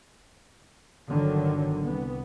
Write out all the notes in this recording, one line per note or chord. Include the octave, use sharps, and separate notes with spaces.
G1 D3 D#3 F#3
C2 B3